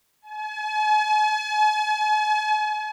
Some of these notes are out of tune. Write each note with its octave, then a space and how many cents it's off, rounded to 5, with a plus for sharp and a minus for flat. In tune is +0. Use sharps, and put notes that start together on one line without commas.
G#5 +45